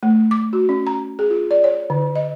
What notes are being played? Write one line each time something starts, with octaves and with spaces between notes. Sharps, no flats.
A3
D6
F#4
C#4
A#5
G#4
F4
D5
C#5
D3
D#5